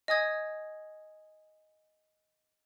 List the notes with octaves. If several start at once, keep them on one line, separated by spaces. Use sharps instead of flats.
D#5 G#5 D#6 G#6